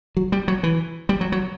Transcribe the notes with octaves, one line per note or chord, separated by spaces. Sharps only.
F#3
G3
F#3
E3
G3
F#3
F#3